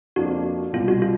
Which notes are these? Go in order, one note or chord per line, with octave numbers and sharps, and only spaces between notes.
F2 C#3 F3 A#3 D4 F#4
C2 B2 G3 F4
F#4
F4